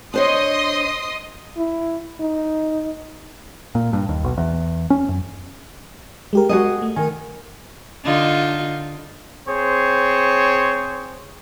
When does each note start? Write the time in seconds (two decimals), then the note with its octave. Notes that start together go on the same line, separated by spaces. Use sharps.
0.14 D4 C5 C#5 D#5 C6 D#6
1.57 E4
2.20 D#4
3.75 A#2
3.93 G2
4.09 D#2
4.24 B1
4.38 E2
4.90 C#4
5.09 F#2
6.33 G#3 G4 A#4
6.49 F#4 G#4 D#5
6.82 A3
6.96 D#3 G#5
8.04 D3 D#4 F4
9.49 C4 G#4 C5 C#5